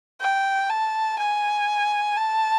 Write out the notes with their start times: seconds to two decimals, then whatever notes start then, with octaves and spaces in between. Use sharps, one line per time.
0.20 G5
0.70 A5
1.19 G#5
2.17 A5